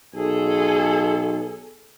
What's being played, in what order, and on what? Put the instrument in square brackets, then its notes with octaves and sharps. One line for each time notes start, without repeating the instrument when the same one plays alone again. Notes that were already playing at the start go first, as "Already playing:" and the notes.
[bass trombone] B1 [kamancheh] G#4 A4